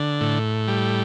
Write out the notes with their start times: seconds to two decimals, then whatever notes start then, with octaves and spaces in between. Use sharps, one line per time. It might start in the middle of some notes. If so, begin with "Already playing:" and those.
Already playing: D3
0.21 A2
0.68 G3